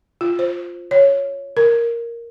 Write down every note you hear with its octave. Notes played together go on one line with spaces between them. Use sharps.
F4
C5
C#5
A#4